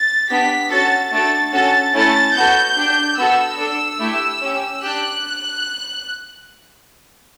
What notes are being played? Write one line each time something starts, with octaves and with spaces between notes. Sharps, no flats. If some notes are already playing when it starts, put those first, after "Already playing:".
Already playing: A6
B3 D4 G4 B6
C#4 F#4 A4 A6
A3 D4 F#4 A4 A6
C#4 F#4 A4 A6
A3 C#4 E4 A4 A6
B3 F#4 A4 G6
D4 G4
B3 F#4 A4 E6
D4 A4
A3 E4 G4
C#4 G4
D4 G4 F#6